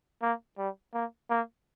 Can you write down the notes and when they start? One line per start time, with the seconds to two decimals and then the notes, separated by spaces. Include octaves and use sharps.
0.22 A#3
0.58 G3
0.94 A#3
1.30 A#3